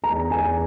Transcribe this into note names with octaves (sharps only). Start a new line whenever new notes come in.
E2 A#5
E2 G#5